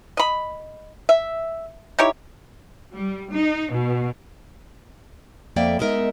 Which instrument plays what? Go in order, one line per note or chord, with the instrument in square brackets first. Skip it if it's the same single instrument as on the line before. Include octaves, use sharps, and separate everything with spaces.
[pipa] D#5 B5
E5
D#4 E4 G4 C#5
[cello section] G3
D#4
B2
[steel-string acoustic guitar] F2 A#3 D5 E5 G5
G#3 B3 D#4 A#4 D#5 E5